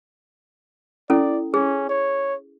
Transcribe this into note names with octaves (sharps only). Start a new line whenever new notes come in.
C#4 E4 A4 D5
C#4 G#4
C#5